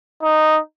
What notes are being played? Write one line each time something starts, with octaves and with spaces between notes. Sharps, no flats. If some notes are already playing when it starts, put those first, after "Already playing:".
D#4